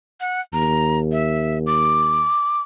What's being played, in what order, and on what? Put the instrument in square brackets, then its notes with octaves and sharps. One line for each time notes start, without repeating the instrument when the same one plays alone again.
[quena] F#5
[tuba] D#2 [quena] A#5
[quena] E5
D6